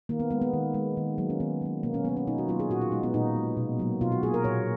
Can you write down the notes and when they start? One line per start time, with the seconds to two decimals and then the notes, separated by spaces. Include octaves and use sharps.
0.09 D#3 A#3
0.20 B3
0.30 G#3 B3
0.41 B3
0.53 D#3
0.74 G#3
0.97 D#3
1.18 F#3 A#3
1.30 C#4
1.40 D#3 B3
1.62 F#3 A#3
1.83 B2 A#3
1.94 C#4
2.05 F#3 A#3 B3
2.17 C#4
2.27 B2 D#4
2.38 F#4
2.48 F#3 A#3 F4
2.60 G#4
2.70 A#2 F#4
2.81 F4
2.92 G#3 D#4
3.03 B3
3.14 A#2 D#4
3.36 G#3
3.57 B2
3.79 F#3 A#3
4.01 B2 F4
4.12 F#4
4.23 F#3 A#3 G#4
4.34 A#4
4.44 A#2 C#5